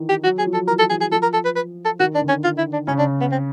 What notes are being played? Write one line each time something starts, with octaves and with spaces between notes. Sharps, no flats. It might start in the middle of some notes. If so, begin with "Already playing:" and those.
Already playing: D#3 E3
G4
F#3 F#4
F#3 G#4
F3
A4
E3 A#4
A4
E3 G#4
G#4
F3 A4
A#4
A4
B4
B4
A4
D#3 F#4
D4
D3
C#4
F4
E4
D4
C#3 C#4
D4
B3
C4